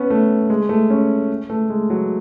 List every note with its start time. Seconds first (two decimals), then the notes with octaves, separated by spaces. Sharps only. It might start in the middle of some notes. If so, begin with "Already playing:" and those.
Already playing: B3 C#4
0.10 A3
0.50 G#3
0.69 A3
0.90 C#4
1.50 A3
1.70 G#3
1.90 F#3